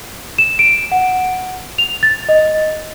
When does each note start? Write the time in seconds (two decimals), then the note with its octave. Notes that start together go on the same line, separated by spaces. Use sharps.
0.38 E7
0.59 D7
0.92 F#5
1.78 F7
2.03 A6
2.29 D#5